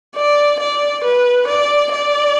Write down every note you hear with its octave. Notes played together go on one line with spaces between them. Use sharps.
D5
D5
B4
D5
D5